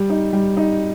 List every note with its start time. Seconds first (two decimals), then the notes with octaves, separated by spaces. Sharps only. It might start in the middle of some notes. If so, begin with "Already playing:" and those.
Already playing: G3
0.10 D#4
0.33 G3
0.57 D#4